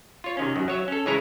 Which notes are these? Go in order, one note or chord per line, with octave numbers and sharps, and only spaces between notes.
F4 C#5
C3 D#3 C#4
F#2 D#3
F#3 C#5 E5
C#4 A4
C#3 E3 G#3 E4 C#5 A#5